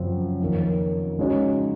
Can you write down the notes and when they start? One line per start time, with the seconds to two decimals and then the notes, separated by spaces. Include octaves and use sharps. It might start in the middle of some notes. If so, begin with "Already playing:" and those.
Already playing: F#2 C#3 F3 C4
0.40 F2 D#3 A#3
1.18 C#3 G#3 D#4 F#4 C#5